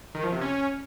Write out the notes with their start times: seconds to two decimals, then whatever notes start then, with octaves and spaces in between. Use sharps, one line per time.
0.15 D#3
0.23 F3
0.32 C3
0.41 C#4